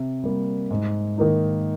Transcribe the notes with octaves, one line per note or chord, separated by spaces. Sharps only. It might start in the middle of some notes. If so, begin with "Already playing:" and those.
Already playing: C3
G3 A#3
G#2
D#3 A#3 D#4